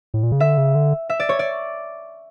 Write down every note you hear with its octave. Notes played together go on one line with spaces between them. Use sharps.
A2
A#2
C#3
D3 E5
C#3
D3
E5
D5
C#5
D5